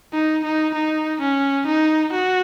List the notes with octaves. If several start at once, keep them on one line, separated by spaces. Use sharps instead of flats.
D#4
D#4
D#4
C#4
D#4
F#4